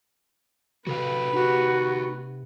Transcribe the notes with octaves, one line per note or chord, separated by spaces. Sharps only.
C3 F#4 A4 B4 F5
D#4 F#4 G4